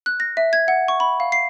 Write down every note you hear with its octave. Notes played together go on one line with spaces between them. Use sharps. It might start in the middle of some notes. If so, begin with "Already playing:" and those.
F#6
A#6
E5
G#6
F#5
C#6
B5
F5
C7